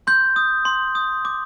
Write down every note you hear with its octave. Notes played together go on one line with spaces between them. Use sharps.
C6 G6
D#6
C6
D#6
D6